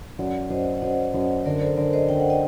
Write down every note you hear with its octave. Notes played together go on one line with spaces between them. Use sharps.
F#2 D5 F#5
F#2 C5 D#5
F#5
F#2 C5 D#5
F#2
D3 A#4 D5
A4 C5
D3 A#4 D5
C5 D#5
D3 G5
F#5
D#5 G5